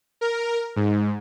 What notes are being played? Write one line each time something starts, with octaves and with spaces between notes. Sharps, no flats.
A#4
G#2